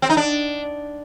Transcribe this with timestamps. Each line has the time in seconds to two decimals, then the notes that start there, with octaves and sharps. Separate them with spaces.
0.02 C4
0.10 D#4
0.17 D4